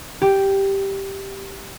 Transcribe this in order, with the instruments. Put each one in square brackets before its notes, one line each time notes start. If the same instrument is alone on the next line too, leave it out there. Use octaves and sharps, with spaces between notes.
[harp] G4